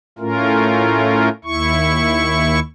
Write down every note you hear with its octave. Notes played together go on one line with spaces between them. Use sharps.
A2 A3 C#4 F4 A#4
D#2 E4 C#6